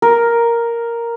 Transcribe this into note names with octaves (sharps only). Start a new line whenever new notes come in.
A#4